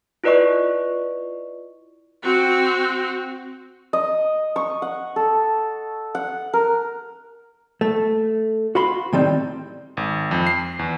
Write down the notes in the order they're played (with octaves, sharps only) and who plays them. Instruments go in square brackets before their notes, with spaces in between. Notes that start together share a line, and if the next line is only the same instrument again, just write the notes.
[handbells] E4 F4 B4 D5 D#5 C#6
[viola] C4 F#4
[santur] D#5
C#6
F#5
A4
F#5
A#4
[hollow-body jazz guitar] A3
F#4 F5 B5 C6
A2 D#3 G3 C4
[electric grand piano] G#1
F2
C7
E2